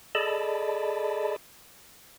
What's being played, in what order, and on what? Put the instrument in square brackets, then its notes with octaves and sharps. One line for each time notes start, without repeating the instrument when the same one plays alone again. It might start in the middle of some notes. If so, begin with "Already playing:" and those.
[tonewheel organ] G#4 A4 D5 D#5 A5 B5